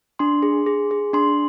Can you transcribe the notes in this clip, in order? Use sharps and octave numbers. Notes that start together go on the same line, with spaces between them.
D4 C6
G#4
G#4
G#4
D4 C6